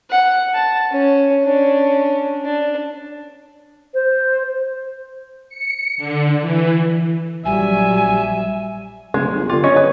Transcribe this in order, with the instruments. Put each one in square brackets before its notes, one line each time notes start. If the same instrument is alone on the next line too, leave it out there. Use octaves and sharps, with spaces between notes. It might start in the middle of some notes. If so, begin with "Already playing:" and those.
[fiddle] F#5
A5
C#4
C#4 D4
D4
[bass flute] C5
[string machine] C#7
D3
E3
[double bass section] A#1 F#3 G3 [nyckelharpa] E5 [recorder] G#5
[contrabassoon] D1 [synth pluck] C#3 [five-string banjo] G#3
[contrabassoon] G1
[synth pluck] D3 G4 [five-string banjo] F4
[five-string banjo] C#4 D#5 [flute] C#5 [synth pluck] C#6
[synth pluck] G#4 [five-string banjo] B4